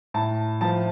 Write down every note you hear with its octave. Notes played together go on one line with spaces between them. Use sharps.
A2 A5
F3 A5